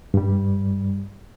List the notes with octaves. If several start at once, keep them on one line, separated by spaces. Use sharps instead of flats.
G2 G3